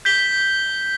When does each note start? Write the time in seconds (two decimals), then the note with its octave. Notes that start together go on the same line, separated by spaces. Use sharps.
0.05 G6 B6 G7